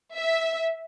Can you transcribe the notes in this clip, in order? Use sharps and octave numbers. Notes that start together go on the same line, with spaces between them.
E5